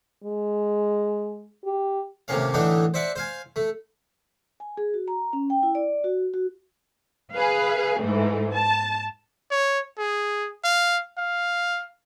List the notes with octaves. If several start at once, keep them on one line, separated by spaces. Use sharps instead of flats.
G#3
G4
D#2 A2 C3 A#3 C#4 F5
A2 D3 E3 D4 D#4 A4
C5 D5 E5 F#5 A5
C5 F5 G#5
A3
G#5
G#4
F#4
A#5
C#4
G5
E4
D5
F#4
F#4
G#4 B4 F5
G#2 E3 A3
A5
C#5
G#4
F5
F5